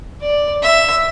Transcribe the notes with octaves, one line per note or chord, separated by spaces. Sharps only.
D5
E5